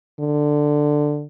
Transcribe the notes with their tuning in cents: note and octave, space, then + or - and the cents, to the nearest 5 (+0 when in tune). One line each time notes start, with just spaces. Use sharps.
D3 +10